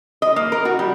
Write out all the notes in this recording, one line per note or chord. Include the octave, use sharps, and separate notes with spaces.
D#5
A#3
A#4
F#4
G3